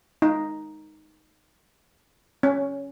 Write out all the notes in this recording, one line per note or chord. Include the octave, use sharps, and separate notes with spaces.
D#4
C#4